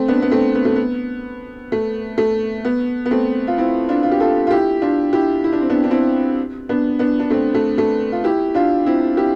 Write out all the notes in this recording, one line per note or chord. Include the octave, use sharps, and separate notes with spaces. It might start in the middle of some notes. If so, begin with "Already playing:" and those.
Already playing: A3 C4
B3 D4
B3
A3 C4
B3
A3
B3
A3
A3
B3
B3
A3 C4
F4
C4 E4
D4 F4
F4
G4
F4 A4
F4
E4 G4
D4 F4
E4 G4
E4
D4
C4
B3 D4
D4
C4 E4
B3 D4
B3 D4
D4
A3 C4
A3
A3
F4
E4 G4
D4 F4
C4 E4
E4 G4